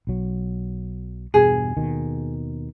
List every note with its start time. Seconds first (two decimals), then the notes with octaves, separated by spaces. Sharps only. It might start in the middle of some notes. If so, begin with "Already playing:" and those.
0.07 B1 F#3
1.34 E2 G2 B2 G#4
1.77 D#2 B2 D#3